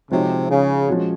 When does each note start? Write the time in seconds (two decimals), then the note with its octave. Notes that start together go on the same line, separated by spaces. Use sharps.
0.11 C3 F3 G#3 D#4 F#4 C#5
0.50 C#3
0.88 F3 G#3 C#4 F#4 C#5